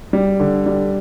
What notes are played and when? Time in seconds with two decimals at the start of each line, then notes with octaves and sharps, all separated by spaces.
0.13 G3
0.40 D3
0.66 G3